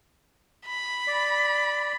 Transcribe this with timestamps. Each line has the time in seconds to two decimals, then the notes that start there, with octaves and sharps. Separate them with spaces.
0.67 B5
1.07 D5